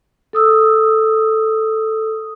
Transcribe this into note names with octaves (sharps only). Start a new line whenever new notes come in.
A4 D#6 E6